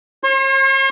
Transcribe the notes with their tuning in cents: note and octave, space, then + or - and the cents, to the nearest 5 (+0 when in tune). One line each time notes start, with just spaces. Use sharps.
C#5 -45 C6 +40